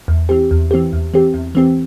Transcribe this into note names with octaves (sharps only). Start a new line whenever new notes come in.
E2
E3 C4 G4
E2
E3 C4 G4
E2
E3 C4 G4
E2
E3 C4 G4